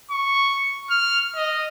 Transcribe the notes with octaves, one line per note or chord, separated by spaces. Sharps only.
C#6
F6
D#5